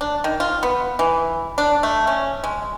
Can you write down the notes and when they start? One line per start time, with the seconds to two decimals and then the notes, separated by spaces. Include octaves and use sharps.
0.01 D4
0.24 D#3
0.40 F4
0.63 B3
0.99 E3
1.58 D4
1.83 A3
2.07 C#4
2.44 G#3